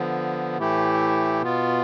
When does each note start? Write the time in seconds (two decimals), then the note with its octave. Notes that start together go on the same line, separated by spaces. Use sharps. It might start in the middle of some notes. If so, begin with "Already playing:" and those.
Already playing: D3 F3 B3
0.58 A2 E3 A3 E4 G4
1.42 B2 B3 F4